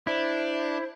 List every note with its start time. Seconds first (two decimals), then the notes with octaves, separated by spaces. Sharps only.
0.07 D4 E4 C5